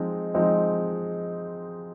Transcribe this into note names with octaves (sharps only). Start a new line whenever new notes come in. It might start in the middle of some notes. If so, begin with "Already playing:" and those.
Already playing: F3 G#3 C4 D#4
F3 G#3 C4 D#4